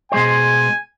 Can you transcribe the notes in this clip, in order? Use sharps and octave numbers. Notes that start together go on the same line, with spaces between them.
B2 G#3 C5 G#5